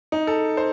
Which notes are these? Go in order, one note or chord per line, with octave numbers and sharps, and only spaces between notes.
D#4
A4
C5